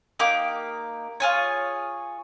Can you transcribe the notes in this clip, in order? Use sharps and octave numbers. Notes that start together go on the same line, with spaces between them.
A#3 D#4 G4 D6
F4 G#4 C#5